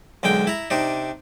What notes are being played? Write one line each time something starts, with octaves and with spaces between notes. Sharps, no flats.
B1 D3 G#3 G5
E4 A#5
C3 D4 D#4